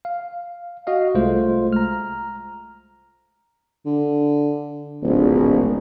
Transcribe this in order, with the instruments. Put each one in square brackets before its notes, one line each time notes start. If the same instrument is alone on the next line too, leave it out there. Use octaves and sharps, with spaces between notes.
[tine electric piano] F5
F#4 D#5 F5
C2 G#3 A3 F4 C5
A#5 F6
[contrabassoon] D3
[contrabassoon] D1 [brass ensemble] A#1 G#2 B2